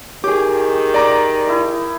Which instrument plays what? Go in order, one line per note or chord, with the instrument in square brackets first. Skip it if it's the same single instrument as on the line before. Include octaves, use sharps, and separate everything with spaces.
[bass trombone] D#3 [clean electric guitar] G4 G#4 [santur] C#5 [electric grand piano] D6
[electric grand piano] D5 A#5 D6
[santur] D#4 E4